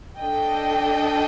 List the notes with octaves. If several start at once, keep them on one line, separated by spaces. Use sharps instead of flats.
D4 A4 D#5 G5